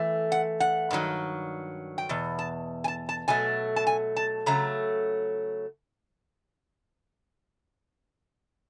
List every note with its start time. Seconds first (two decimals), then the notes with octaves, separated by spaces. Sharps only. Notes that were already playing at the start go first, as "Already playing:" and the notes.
Already playing: E3 A3
0.32 F#5
0.60 F#5
0.91 G2 D#3 F#3
1.98 G5
2.09 E2 B2
2.39 A5
2.84 G#5
2.88 A5
3.09 A5
3.28 B2 F#3 A3 G#5
3.76 A5
3.87 G#5
4.16 A5
4.46 C#3 F#3 A3 A#5